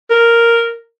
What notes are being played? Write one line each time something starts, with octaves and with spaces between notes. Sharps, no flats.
A#4